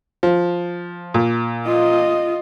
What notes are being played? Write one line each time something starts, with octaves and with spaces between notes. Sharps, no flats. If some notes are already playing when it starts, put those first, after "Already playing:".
F3
A#2
F4 D#5